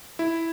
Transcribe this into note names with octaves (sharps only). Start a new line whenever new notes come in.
E4